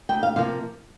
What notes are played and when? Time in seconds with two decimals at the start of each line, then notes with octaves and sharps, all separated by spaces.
0.09 D2 G5
0.23 F5
0.36 C3 F3 A#3 F5